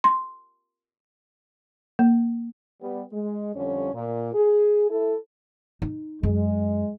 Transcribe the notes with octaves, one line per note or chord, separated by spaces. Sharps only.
C6
A#3
G3 B3
G#3
F2 D3 G3 C#4 C#5
A#2
G#4
E4 A4
D#4
F#2 G#3